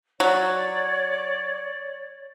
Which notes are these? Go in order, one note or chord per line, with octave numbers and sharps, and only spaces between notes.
F#3 C#5 D5